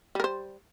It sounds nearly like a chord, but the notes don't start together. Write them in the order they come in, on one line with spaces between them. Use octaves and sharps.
G3 A#4 C5